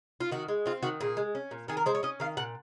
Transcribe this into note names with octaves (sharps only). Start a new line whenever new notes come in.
F4
D#3 F#4
G#3
C4 F4
D#3 F#4
A#2 G#4
G#3
C#4
A#2
D#3 G#4
A#4
G#3 C5
C#5
C#4 D#5
D#3 F5
A#2 F#5